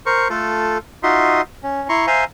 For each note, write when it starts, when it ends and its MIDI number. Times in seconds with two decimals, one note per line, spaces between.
0.06 0.28 70
0.06 0.28 72
0.06 0.28 85
0.30 0.78 57
0.30 0.78 65
0.30 0.78 69
1.03 1.41 63
1.03 1.41 65
1.03 1.41 66
1.03 1.41 75
1.03 1.41 76
1.03 1.41 84
1.63 1.88 61
1.89 2.07 64
1.89 2.07 82
1.89 2.07 84
1.89 2.07 85
2.07 2.24 72
2.07 2.24 76
2.07 2.24 77
2.07 2.24 80
2.07 2.24 82
2.07 2.24 84